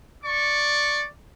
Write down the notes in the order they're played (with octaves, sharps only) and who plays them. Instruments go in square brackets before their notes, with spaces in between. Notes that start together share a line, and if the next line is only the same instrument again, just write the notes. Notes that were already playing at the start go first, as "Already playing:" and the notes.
[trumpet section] D5 C#6